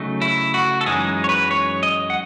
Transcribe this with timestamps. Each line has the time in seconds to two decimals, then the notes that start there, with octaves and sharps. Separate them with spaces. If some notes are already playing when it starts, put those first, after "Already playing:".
Already playing: C#3 F#3 A3 D#4
0.22 E4
0.54 F#4
0.81 A4
0.86 F#2 E3 G#3 B3 D#4 G#4
1.24 C#5
1.29 B4
1.51 C#5
1.83 D#5
2.10 F#5